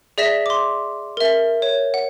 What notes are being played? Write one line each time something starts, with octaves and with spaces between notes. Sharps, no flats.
G#4 D5 E5 A#6 B6 E7
C6 D6
A#4 E5
C#5
F#5